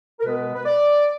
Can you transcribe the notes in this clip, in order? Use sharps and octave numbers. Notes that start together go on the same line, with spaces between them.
A#4
B2 G#3 B3 B4
B4
D5